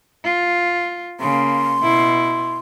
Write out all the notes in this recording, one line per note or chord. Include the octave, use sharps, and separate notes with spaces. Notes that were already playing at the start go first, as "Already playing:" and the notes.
F4
C#3 A#3 C6
B2 E4